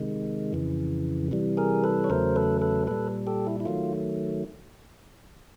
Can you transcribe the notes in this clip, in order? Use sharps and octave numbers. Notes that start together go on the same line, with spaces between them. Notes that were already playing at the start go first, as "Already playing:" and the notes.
Already playing: C3 D#3 G#3
F2 C#3 E3
C3 E3 G3
G#4 A#4
A4 B4
C#5
E2 C#3 F#3 A3 A#4 C5
A4 B4
A4 B4
A#2 G3 A4 B4
G4 A4
E4
E4
D#3 F#3 A3 F4